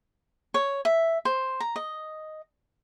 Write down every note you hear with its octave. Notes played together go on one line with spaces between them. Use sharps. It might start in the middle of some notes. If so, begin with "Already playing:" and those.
C#5
E5
C5
A#5
D#5